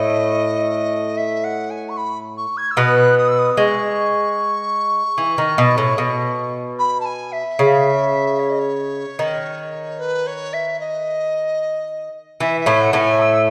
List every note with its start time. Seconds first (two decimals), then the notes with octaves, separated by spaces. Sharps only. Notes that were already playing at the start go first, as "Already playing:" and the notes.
Already playing: A2 A3 D#5
1.17 E5
1.44 F#5
1.70 G#5
1.89 C#6
1.97 B5
2.37 C#6
2.57 G#6
2.70 E6
2.77 B2 B3 F#6
3.17 D#6
3.28 E6
3.38 D#6
3.57 G#3 C#6
5.18 E3
5.38 D#3
5.58 B2
5.78 A2
5.98 B2
6.78 B5
7.00 A5
7.05 G#5
7.32 E5
7.59 C#3
8.39 C#5
8.49 D#5
8.59 C#5
9.19 D#3
9.99 B4
10.26 C#5
10.53 E5
10.79 D#5
12.40 E3 E5
12.60 E5
12.66 A2 A3
12.80 F#5
12.93 A2 A3
13.00 G#5
13.20 E6